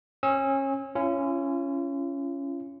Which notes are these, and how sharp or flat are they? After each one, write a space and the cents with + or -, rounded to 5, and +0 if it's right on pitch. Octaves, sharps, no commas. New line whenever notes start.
C#4 -30 E6 -35
C#4 +0 F4 -45